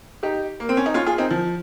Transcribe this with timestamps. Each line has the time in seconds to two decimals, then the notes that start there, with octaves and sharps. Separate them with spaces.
0.23 D#4 G4
0.60 A#3
0.69 C4
0.77 C#4
0.86 D#4
0.94 C#4 F4
1.06 F4 G#4
1.18 C4 D#4
1.31 F3